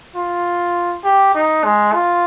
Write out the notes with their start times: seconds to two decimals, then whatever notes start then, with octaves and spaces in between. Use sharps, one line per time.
0.16 F4
1.04 G4
1.35 D#4
1.64 G#3
1.94 F4